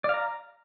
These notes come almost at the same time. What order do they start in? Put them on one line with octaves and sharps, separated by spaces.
D5 F5 A#5